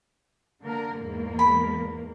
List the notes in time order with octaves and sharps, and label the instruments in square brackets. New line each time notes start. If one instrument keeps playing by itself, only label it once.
[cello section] D3 A#3 A#4
E2 G#2 A#3
[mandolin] B5